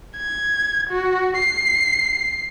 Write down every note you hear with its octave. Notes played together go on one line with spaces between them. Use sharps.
G#6
F#4
C7